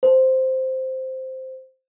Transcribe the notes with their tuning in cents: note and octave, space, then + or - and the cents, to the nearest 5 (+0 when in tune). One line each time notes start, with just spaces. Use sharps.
C5 -5